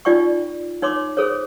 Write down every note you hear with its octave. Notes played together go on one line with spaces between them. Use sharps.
D#4 F4 D5 G5 C#6
D#4 C#5 C6 D6
G#4 A4 C5 C#5